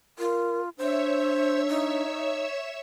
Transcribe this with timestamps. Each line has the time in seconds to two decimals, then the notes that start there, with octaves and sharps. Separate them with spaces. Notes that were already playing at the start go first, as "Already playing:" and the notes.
0.19 F4 A#4
0.78 D4 C5 C#5 E5 E6
1.69 D#4